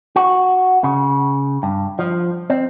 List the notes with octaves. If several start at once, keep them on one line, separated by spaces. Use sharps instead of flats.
F#4
C#3
G2
F3
C4